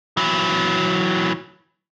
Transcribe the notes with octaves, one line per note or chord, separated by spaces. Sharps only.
E3 F#3